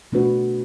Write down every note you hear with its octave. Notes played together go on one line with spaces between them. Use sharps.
B2 A3 D4 F#4 B4